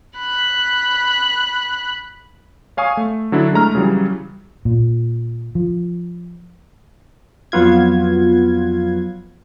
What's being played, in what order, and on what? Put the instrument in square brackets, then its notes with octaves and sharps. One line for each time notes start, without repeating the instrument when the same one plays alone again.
[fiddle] B5 F#6
[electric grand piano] C#5 F5 G#5 C#6 D#6
A3
D3 F#3 D4 E4
G#3 A3 A#5 F6
C#3 E3 F#3 G3 C#4
[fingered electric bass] A#2
F3
[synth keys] F2 F#3 B3 F4 G#6